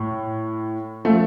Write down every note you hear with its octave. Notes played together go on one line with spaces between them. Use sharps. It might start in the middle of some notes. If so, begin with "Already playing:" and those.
Already playing: A2
F3 A3 A4